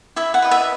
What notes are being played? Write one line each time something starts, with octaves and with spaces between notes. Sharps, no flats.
E4 E5
F#5
B4 D#5
E5